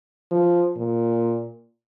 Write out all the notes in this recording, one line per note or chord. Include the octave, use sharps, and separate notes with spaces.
F3
A#2